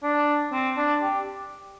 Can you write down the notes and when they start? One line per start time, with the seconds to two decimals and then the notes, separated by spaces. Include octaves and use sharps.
0.03 D4
0.52 C4
0.77 D4
1.02 G4